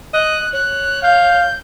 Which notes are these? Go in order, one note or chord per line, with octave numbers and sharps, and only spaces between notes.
D#5 F#6
C#5 F#6
F5 G6